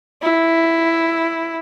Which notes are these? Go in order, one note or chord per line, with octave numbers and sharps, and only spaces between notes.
E4